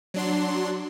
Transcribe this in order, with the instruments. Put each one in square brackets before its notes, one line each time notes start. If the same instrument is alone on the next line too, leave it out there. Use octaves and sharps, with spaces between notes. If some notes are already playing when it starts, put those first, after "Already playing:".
[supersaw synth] F#3 D4 C6